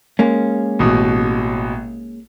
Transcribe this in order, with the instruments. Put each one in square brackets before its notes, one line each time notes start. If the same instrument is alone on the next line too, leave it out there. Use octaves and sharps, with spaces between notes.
[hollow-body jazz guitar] G#3 A#3 C#4
[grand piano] A1 B2